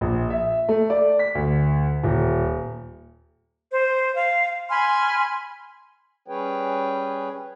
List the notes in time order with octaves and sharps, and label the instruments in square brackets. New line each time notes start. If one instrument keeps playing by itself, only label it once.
[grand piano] A#1
E5
A3
D5
B6
D2
D#1
[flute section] C5
F5
G#5 B5 C6 F6
[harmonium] G3 C#4 G#4 B4 C#5 G5